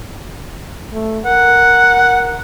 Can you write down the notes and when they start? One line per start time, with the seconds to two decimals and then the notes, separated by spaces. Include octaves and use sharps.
0.93 A3
1.25 A#4 F#5